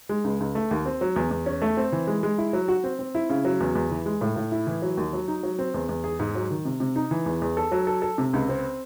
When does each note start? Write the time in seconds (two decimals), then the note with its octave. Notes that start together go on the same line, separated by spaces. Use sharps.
0.09 G#3
0.24 C#2
0.40 C#2
0.55 A3
0.71 D#2
0.86 C4
1.01 F#3
1.16 E2
1.31 E2
1.46 C#4
1.62 A3
1.77 C4
1.92 E3
2.07 G#3
2.23 G#3
2.38 E4
2.53 F#3
2.68 F#4
2.84 C4
2.99 C4
3.15 E4
3.30 C#3
3.45 F#3
3.60 E2
3.75 E2
3.91 E3
4.06 G#3
4.21 A2
4.36 A2
4.52 E4
4.67 E3
4.82 F#3
4.97 D#2
5.13 F#3
5.28 D#4
5.43 F#3
5.59 C4
5.74 E2
5.89 E2
6.04 G#4
6.19 G#2
6.35 F#3
6.50 D#3
6.65 C3
6.80 C3
6.96 D#4
7.11 E3
7.26 E2
7.42 E2
7.57 A4
7.72 F#3
7.87 A4
8.02 A4
8.18 C3
8.33 C#2
8.49 C4